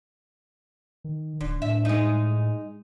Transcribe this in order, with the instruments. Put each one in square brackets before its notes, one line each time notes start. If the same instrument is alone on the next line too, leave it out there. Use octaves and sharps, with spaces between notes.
[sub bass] D#3
[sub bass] D1 [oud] D3
[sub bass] A2 [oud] E5
[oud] G#3 D#4